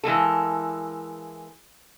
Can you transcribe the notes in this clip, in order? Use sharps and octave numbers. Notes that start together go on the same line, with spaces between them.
E3 G#3 A#3 A4